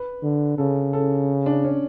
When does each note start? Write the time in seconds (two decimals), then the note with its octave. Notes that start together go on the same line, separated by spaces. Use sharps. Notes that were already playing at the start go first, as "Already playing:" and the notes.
Already playing: B4
0.23 D3
0.58 C#3 A4
0.93 A4
1.46 D4
1.64 C#4